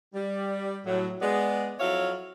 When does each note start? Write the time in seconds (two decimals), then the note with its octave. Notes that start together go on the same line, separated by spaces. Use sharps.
0.15 G3
0.86 A2 F#3
1.21 G#3 B3 D5
1.80 F2 F#3 E4 C#5 E5 F5